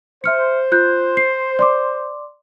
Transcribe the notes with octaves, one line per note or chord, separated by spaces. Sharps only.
C5 E5 F6 C#7
F4 F#6 G6
C7
D5 C6 D6